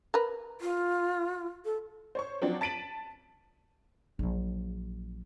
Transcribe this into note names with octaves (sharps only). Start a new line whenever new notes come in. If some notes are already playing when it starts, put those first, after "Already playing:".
A#4 B4
F4
A4
C5 C#5 C#6
F3 F#3 C4 D4
A5 A6 B6 D7 D#7 F#7
A#1 F#3